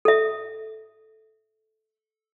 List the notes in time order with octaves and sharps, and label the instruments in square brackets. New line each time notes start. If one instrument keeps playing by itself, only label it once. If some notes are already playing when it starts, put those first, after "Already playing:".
[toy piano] A4 E5